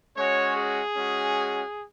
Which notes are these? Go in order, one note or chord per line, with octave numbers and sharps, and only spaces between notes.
G#3 C#4 F#4 C#5
G#4
G#3 C#4 F#4